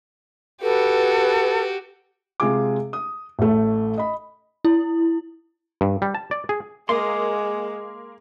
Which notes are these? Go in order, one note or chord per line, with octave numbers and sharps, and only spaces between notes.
F#4 G4 A4 B4
C3 G#3 F4 G#4 G#5 D6
D#6
A1 A3
D#5 B5
E4
G2
G3
A5
D5
G#4
G#3 A#3 C6 D6 D#6